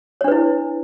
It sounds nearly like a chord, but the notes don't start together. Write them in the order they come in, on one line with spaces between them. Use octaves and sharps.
C#5 D4 B4 E4